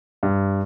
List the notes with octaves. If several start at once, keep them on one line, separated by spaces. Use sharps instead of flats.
G2